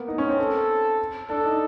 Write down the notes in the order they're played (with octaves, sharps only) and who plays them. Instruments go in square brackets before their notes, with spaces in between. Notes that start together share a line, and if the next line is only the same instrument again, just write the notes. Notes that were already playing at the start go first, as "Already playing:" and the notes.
Already playing: [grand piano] A#3 B3
D#4
C#4
C4
[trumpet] A4
[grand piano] D4 [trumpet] A4
[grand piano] D#4